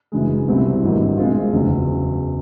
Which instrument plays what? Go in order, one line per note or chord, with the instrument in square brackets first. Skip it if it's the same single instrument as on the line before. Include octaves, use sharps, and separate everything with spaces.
[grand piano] F#1 F#2 C#3 E3 G#3
C2 B2 G3 C4 E4
G#1 G2 E3 G3 A#3
B2 G#3 C4 F4
F#1 E2 C#3 F#3